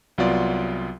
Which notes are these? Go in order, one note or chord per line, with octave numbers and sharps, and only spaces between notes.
C2 F#3 B3 F4 D5